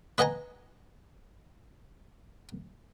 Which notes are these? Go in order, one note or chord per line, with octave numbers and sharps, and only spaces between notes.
B4 D#5 F#5 G#5 A#5